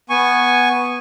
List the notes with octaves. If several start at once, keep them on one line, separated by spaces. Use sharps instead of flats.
B3 G#5 C#6